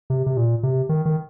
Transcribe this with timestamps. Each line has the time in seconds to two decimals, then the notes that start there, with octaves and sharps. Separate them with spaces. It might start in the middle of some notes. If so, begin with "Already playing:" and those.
0.10 C3
0.26 C3
0.37 A#2
0.63 C3
0.89 D#3
1.05 D#3